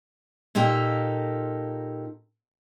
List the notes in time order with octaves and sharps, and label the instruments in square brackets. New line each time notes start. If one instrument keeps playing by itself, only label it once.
[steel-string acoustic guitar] A#2 A#3 D#4 G4 A4